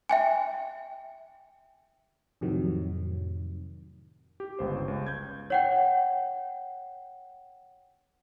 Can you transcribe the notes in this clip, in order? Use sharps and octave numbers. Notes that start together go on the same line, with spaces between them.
E5 G5 G#5
F2 A2 C3 D#3 F#3
G4
G1 C#2 C5
C#2
G6 G#6
C#5 F#5 G5